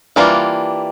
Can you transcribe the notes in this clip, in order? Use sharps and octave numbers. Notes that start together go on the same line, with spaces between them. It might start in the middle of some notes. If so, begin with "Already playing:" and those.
E3 G3 A#3 D4 F4